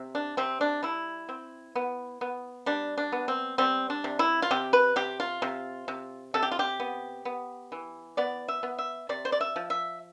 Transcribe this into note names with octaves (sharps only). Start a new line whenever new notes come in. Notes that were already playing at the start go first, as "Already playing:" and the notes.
Already playing: C3
D4
C3 C4
D4
G3 E4
C4
B3
B3
G3 D4
D4
B3
C4
G3 C4
D4
C3
E4
F4
C3 G4
B4
C3 G4
F4
C3
C3
C3 A4
G4
F4
G4
B3
B3
E3
B3 D5
E5
B3
E5
C3 D5
C5
D5
E5
F3
E5